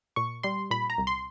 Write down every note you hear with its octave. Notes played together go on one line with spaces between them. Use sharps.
A#2 C#6
G3 C6
A#2 B5
A#5
C2
C6